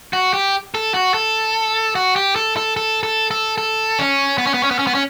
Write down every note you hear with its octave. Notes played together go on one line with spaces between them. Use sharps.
F#4
G4
A4
F#4
A4
F#4
G4
A4
A4
A4
A4
A4
A4
C#4
B3
C#4
B3
C#4
B3
C#4
B3
C#4